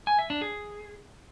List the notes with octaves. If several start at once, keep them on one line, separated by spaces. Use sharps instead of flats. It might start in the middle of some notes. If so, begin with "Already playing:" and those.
G#5
E5
D4
G#4